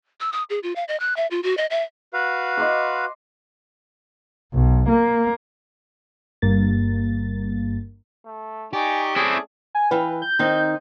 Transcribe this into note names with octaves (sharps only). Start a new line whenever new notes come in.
E6
D#6
G#4
F4
F5
D#5
F#6
E5
F4
F#4
D#5
E5
F#4 B4 F5
D#5 C6 D6
B1
A#3
G1 G2 A#3 A6
A3
D#4 G4 D5 G#5 C#6
A3 C4 C#4 E4 G#4 D5
G#5
E3 B4 F5 G5
G6
D#3 C4 D#4